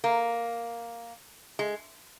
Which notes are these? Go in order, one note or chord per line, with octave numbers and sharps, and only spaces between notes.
A#3
G#3